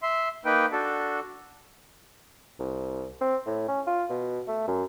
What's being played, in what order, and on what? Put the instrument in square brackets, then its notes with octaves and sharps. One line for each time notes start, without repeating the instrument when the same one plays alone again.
[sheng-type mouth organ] E5 C6
A#3 D#4 B4 G5
D4 F#4 A4
[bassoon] C2
C4
A2
C#4
F4
B2
A3
F#2